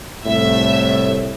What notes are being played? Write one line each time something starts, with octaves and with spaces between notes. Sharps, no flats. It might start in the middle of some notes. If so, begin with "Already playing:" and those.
C2 A2 E5